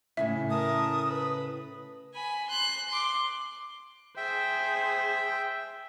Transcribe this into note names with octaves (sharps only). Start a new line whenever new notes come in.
A2 C#3 E4 E5
A#4 A5 D#6
B4
G#5 B5
C6 F#6
C6 D6
G#4 C5 E5 G5